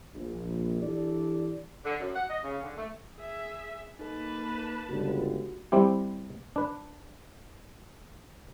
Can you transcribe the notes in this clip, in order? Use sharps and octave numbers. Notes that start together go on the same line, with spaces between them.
A#1
E3 D4 E4 G4 A4 D5
D3
F#2
F#5
D#5
C#3
D3
A3
G#4 E5
A#3 D#4 A4 B4 A5
G1 C#2 F#4
G3 C4 E4 G4
D4 B4